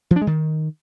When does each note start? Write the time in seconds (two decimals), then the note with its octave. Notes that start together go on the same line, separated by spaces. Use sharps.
0.11 F3
0.16 D4
0.22 G#3
0.27 D#3